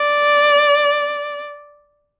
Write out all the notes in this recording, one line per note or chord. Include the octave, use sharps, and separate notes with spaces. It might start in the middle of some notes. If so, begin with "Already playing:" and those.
Already playing: D5